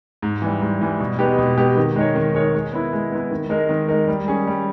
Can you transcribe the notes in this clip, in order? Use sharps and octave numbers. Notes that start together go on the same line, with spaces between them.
G#2
E3 G3
G#2
E3 G3
B2
G#3 B3 D#4 G4
B2
G#3 B3 D#4 G4
D#3
G#3 D#4 A#4 C#5
D#3
G#3 D#4 A#4 C#5
G#3
B3 E4
G#3
B3 E4
D#3
G#3 D#4 A#4
D#3
G#3 D#4 A#4
G3
C#4 G#4
G3